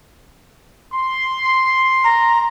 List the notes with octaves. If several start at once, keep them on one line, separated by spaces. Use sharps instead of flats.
C6
A#5